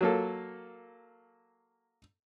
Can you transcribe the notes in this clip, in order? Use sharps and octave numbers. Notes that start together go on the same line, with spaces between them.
F#3 A#3 A4